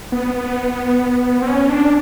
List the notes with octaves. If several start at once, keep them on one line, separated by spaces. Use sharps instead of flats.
B3
B3
C4
C#4
D4